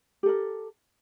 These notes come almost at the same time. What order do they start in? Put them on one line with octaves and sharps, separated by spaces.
G4 A4 A#4